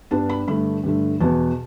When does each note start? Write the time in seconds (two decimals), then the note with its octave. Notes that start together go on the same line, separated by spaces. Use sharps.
0.11 G2 G3 B3 D4 A5
0.30 B5
0.48 G2 D3 A3 D4 B5
0.83 G2 D3 A3
1.21 E2 B2 B3 A5